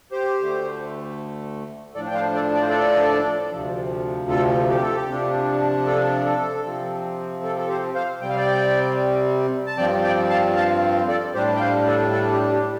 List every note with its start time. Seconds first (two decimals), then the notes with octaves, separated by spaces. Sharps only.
0.12 G4 C5
0.38 D2 D3 A3
1.94 A2 F3 D4 A4 D5
2.07 G5
2.14 C5 F5
2.34 A4 D5
2.54 D5
2.62 C5
2.69 A4 D5
3.51 D2 C3 F3
4.30 A4
4.70 G4
4.82 A4
4.96 G4
5.08 C3 F3 D4
5.87 A4
6.25 A4
6.65 C3 F3 C4
7.44 A4
7.58 A4
7.69 G4 C5
7.95 C5 F5
8.21 C3 G3 C4 G5
8.29 F5
8.37 D5 G5
9.67 A5
9.78 G2 F3 C4 D5 G5
10.04 D5 G5
10.30 F5 A5
10.56 F5 A5
11.08 A4 D5
11.34 A2 G3 D4 G4 C5
11.56 G5
11.60 C5 F5
11.87 A4
12.13 A4
12.32 G4
12.52 G4